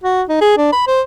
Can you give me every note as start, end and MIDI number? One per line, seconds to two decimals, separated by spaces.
0.04 0.22 66
0.29 0.39 63
0.41 0.57 68
0.57 0.70 62
0.72 0.85 83
0.87 1.01 72